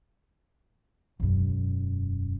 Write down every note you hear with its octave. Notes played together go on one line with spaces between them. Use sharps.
E1 F#2